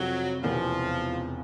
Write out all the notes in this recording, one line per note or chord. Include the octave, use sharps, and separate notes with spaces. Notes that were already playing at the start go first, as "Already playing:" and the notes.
Already playing: F2 C3 F3 F#3
E1 E2 C3 F3